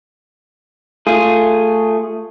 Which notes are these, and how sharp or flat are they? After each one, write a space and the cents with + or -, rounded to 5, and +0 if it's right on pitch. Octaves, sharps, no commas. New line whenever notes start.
A3 +10 F4 +0 G#4 +0